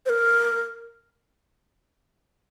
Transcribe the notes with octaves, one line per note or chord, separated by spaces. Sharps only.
C5
A#4